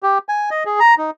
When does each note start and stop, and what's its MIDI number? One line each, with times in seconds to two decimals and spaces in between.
0.03 0.18 67
0.29 0.50 80
0.51 0.64 75
0.66 0.80 68
0.80 0.95 82
0.98 1.10 63